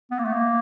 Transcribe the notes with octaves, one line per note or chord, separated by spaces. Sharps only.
B3
A#3
A3
A#3